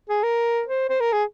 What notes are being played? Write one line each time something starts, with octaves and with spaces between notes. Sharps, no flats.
G#4
A#4
C5
C5
A#4
G#4